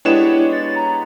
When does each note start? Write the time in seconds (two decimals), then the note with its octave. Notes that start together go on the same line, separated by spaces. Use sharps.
0.05 G#3 B3 D4 E4 G4 C#5 E7
0.53 A6
0.76 A#5